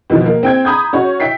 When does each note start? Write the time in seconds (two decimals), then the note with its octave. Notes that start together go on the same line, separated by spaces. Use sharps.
0.10 B2 D#3 F3
0.26 A#3
0.43 C4 G5 G#6
0.65 A#5 B5 D#6 G6 G#6
0.93 C#4 F#4 C#5
1.20 E5 G5 B6 C7